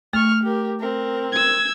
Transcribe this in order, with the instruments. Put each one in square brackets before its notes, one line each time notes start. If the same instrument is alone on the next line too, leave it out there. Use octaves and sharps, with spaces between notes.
[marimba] A3 [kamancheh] C#6 F6
[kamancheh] G4 A#4
C4 A#4
[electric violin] E6 G#6